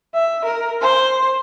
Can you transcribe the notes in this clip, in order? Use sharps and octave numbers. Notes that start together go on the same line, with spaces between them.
E5
A#4
C5